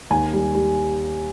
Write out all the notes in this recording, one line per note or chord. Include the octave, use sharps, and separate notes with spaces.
D#2 G#5
G3
G3